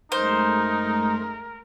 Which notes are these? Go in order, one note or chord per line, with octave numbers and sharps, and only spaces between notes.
F#2 G#3 A3 D#4 A#4 C5